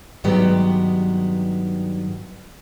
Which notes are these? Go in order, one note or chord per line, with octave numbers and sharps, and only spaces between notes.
G2 D#3 F#3 G#3 B3 G4